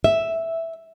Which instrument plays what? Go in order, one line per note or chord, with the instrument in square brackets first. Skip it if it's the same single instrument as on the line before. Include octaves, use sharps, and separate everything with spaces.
[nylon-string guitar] E5